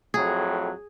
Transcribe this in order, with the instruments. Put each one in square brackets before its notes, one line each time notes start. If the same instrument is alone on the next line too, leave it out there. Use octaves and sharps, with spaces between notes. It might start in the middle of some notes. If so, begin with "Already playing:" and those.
[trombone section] F2 A2 F#3 [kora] G#4